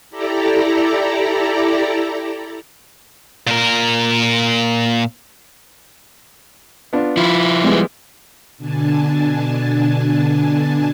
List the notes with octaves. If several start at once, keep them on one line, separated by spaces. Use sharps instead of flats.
E4 G4 A4 D5 A#5
A#2 A#4
B3 D4 F4
F3 E4 F4
G3 G#3 B3
B2 D3 D4 G#5 A5